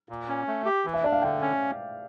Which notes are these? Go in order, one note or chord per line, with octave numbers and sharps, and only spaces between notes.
A#2
C#4
A3
G4
E3
E5
D4 D5
F5
D3 E5 G5
C#4